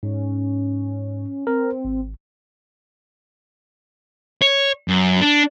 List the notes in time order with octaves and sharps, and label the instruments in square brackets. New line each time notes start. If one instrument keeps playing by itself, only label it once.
[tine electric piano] G#2 [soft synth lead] C#4
[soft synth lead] C4 [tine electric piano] A#4
[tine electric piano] G#1
[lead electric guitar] C#5
F#2
D4